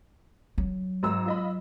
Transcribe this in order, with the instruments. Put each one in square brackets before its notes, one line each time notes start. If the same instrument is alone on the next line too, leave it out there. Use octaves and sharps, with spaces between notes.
[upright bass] F#3
[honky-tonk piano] G#1 A#5 E6
F4 D#5 B5